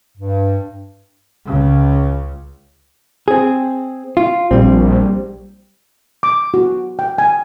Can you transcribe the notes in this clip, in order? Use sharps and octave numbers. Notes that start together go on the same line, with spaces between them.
G2
C#2 C#3
C4 G#4
F4
A#1 G3 C4
D6
F#4
G5
G#5